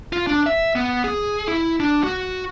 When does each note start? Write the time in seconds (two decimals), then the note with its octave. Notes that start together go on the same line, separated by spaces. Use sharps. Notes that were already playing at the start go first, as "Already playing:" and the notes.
0.13 F4
0.27 D4
0.46 E5
0.75 B3
1.04 G#4
1.47 E4
1.80 D4
2.04 F#4